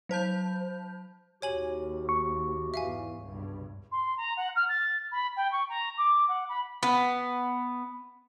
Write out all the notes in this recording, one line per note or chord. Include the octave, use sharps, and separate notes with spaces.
F#3 C5 A5 G6
D#2 F#4 G4 C#5 G#5 F#7
C#6
E2 G#2 E5 F5 G#5
C#2 G2 B2
C6
A#5
F#5
F6
A6
B5
G5
C#6
A#5
D6
F#5
B5
B3